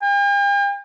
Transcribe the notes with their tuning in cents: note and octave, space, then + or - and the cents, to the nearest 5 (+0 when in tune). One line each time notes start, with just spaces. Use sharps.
G5 +45